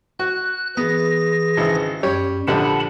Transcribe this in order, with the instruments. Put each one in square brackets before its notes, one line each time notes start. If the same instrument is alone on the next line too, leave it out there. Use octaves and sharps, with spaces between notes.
[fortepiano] F#4 [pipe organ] F#6
[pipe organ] E3 G#4 A#6 [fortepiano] B3
[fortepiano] G#1 C#3 E4
[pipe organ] F#2 [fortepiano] G3 C#5
[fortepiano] A#1 D3 G3 [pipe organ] F#5 A5 B5